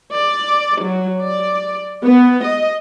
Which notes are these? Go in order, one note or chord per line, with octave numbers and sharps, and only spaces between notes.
D5
F#3
D5
B3
D#5